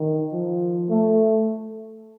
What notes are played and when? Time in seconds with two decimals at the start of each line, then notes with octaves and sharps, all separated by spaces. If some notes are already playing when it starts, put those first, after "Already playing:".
Already playing: D#3
0.33 F3
0.89 A3